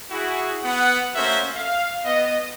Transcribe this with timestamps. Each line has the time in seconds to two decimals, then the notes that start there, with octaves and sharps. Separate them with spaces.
0.11 E4 F#4 G#4
0.64 B3 F#5
1.15 A3 A#3 C#4 F#4 C5 E5
1.55 F5
2.05 B3 D#5